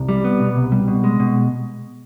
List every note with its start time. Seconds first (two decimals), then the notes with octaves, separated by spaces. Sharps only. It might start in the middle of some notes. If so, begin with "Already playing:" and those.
Already playing: C2
0.09 G3
0.24 B3
0.40 B2
0.56 C2
0.72 G3
0.88 B2
1.04 G#3
1.20 B2